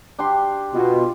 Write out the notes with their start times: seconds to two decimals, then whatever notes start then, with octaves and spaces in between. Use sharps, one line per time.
0.19 D4 G4 C6
0.74 B2 F4